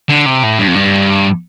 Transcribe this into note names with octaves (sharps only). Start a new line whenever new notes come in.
D3
C3
A2
G2
F2
G2